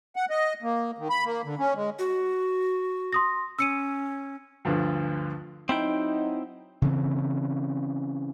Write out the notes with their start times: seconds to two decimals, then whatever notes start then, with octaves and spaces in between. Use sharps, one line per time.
0.16 F#5
0.30 D#5
0.62 A#3
0.98 D#3
1.10 B5
1.25 A#3
1.45 D3
1.59 C#4
1.76 G#3
1.99 F#4
3.13 C6 D#6 A#6
3.59 C#4 E6 C#7 D#7
4.65 D2 G2 D3 F3
5.69 F#3 C4 D#4 E4 G5
6.82 C#3 E3 C4